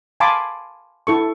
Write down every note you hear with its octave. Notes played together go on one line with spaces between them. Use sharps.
F5 G#5 A5 B5 C6 D6
E4 A4 C#6